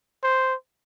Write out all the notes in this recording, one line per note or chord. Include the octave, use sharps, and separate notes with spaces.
C5